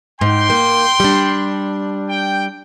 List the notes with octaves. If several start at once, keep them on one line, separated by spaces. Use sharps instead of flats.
G#2 G5 C6
A#3
G3 D4
G5